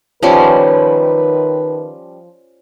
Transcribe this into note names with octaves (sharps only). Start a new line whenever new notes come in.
D#3 F3 G3 C#4 B4